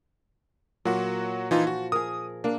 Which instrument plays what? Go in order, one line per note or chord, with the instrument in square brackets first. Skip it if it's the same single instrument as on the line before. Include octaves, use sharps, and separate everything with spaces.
[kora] A#2 [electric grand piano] F#3 F#4
[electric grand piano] E3 D#4 F4 [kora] F3
[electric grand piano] F#4
[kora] G#4 A#4 [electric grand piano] D#6
[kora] A#3 [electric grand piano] D4